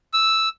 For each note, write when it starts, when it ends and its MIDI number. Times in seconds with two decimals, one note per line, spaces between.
0.14 0.49 88